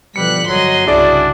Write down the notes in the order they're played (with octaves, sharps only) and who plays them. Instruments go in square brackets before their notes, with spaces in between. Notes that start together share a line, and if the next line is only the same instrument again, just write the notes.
[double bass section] B2 D3 F3 [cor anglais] G3 [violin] F#6 B6 [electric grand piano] C#7
[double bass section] G1 [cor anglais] F#3 [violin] D#5 C6
[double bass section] C2 C#3 [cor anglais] D4 [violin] E4 F#4 [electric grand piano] G#4 D5